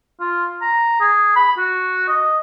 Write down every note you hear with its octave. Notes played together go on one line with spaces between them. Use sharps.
F4
A#5
G#4
B5
F#4
D#5